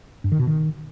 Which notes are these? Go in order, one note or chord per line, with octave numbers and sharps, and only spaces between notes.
G2
D#3
B2
D#3